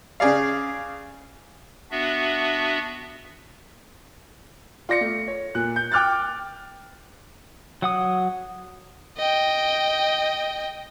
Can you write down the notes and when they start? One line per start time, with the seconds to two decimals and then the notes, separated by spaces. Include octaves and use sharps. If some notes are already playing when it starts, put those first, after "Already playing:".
0.20 C#3 G#4 D5 F5
1.91 B3 D4 F#4 E5
4.89 F4 D5 A#6 C#7
5.01 A3
5.28 C#5
5.55 A#2 F#6
5.76 G6
5.92 G5 D6 F6 F#6 A6
7.82 F#3 F#5 D#6
9.17 D#5 G5